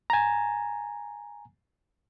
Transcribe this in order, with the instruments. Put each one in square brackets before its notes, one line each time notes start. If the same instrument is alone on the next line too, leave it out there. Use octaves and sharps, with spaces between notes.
[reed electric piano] G#5 A#5